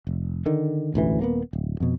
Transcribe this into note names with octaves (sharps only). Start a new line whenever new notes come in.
F1
D3 D#3
E1 A1 D2 E3
D#1 A#3 B3
D1
F2 B2